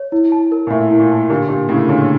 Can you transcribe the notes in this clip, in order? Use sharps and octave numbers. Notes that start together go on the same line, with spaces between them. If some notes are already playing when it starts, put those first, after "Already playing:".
Already playing: C#5
E4
A5
A#4
A#2
A2 E5
E4
A#2
A5
A#2 D3 G4
A#2 G4
A2 C#3 A#4
A#2 D3 C#5